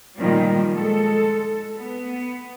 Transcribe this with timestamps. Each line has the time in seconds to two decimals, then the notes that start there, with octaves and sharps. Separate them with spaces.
0.17 A#2 D#3 F3 G3
0.73 G#3 A4
1.78 B3